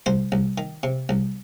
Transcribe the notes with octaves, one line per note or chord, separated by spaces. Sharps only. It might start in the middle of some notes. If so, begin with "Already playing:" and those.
C2 C5
C2
D#3
C3
C2